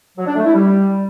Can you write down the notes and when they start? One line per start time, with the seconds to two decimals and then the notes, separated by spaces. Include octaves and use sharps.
0.17 F#3
0.26 D4
0.35 A3
0.44 E4
0.53 G3